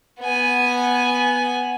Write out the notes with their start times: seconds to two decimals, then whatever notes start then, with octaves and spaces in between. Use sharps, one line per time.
0.20 B3 G#5